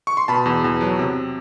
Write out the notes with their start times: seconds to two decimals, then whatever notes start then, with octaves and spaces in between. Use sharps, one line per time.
0.07 C#6
0.17 C6
0.28 B2 A5 B5
0.46 E2
0.64 E2
0.81 F#3
0.99 C3